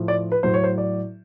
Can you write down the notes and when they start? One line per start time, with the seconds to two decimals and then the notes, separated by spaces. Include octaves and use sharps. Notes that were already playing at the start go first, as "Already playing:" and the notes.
Already playing: A2 F3
0.08 D5
0.32 B4
0.43 A2 F#3 C5
0.54 C#5
0.64 C5
0.78 D5